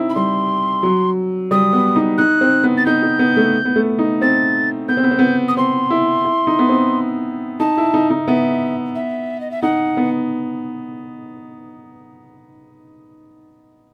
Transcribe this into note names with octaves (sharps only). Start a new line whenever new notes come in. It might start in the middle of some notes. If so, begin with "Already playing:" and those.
Already playing: C4 D#4 E4
B5
G3 C6
F#3
G3 D#6
B3
D#4
D#4 F#6
C4
B3
A6
D#4 G6
D#4
B3
A3
B3
A3
D#4
C4 A6
B3 G6
C4
B3
C4
B3
D#6
C4 C6
E4
E4
D#4
B3
C4
D#4 A5
E4
D#4
D#4
B3 E5
E5
D#5
E5
D#4 F#5
B3